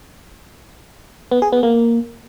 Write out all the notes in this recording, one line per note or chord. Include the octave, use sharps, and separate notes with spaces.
B3
G#4
B3
A#3